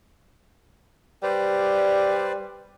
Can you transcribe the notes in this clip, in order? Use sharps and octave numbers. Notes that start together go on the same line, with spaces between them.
G3 B4 C5 D5